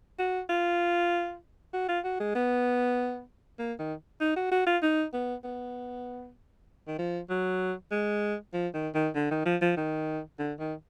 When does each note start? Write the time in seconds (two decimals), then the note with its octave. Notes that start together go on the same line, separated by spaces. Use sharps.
0.19 F#4
0.49 F4
1.73 F#4
1.89 F4
2.04 F#4
2.20 G#3
2.35 B3
3.59 A#3
3.79 D#3
4.21 D#4
4.36 F#4
4.51 F#4
4.66 F4
4.82 D#4
5.13 B3
5.44 B3
6.87 D#3
6.99 F3
7.30 F#3
7.91 G#3
8.53 F3
8.74 D#3
8.94 D#3
9.15 D3
9.31 D#3
9.45 F3
9.61 F3
9.77 D#3
10.39 D3
10.59 D#3